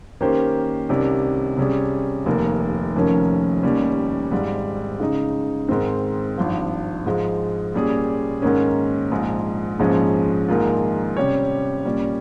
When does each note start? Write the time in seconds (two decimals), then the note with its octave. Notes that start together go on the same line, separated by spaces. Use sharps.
0.21 D#3 A#3 C#4 G4 C5
0.89 C2 C3 D#3 G3 C#4
1.57 C3 G3 C#4 G#4
2.26 F1 D#2 D#3 A#3
2.95 F1 F2 D#3 A#3 C#4
3.63 F1 D#2 D#3 G3 C#4
4.31 G#1 G#2 G3
5.00 C#3 G#3 D#4
5.69 G#2 D#3 G#3 C4
6.38 G#1 G2 F3
7.06 G#2 F3 G#3
7.74 A#2 G3 C#4 G#4
8.42 G#2 D#3 A#3 C#4
9.12 A#1 G#2 F3 G#3
9.79 A#1 G#2 F3 G#3 C#4
10.48 A#1 G#2 D#3 A#3 F4
11.17 C3 G3 C#4 G4 C#5
11.85 A#2 G3 C#4